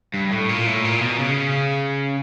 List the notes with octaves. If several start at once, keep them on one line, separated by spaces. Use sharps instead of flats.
G2
A2
A#2
A2
A#2
B2
C#3